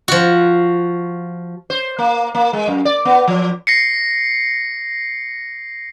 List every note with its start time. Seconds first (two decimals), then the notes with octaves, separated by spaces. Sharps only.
0.08 F3 F#4
1.70 C5
1.98 A#3
2.35 A#3
2.53 G#3
2.68 F#2
2.85 D5
3.05 B3
3.28 F3
3.67 A#6 C7 C#7